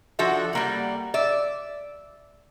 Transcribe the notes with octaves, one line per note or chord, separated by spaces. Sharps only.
F3 D4 F#4 A4 E5
G3 A#3 F#5
D5 E5